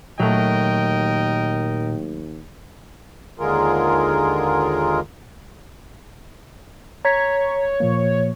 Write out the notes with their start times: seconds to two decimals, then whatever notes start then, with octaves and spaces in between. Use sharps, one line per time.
0.20 D#2 A#2 F#3 A3 A#4 D#5 G5
3.39 D#2 D3 G#3 F4 G#4 A#4
7.05 C#5 A#5 G#6 B6
7.80 A#2 F3 A#3